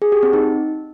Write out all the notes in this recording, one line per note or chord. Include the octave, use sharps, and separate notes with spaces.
G#4
G4
C4
D#4